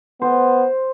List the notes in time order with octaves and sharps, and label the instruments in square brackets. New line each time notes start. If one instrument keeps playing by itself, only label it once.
[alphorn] B3 [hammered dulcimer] C5